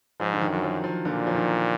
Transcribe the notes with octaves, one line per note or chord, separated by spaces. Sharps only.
G#2 F3
D3
D#3
F#2 F#3
F3
F3
A#2 D3
F3
D#3